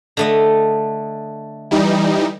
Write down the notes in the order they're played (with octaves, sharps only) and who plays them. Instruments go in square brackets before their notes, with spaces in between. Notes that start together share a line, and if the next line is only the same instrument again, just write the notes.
[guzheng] D3 A3 D#5
[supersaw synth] E3 G3 D#4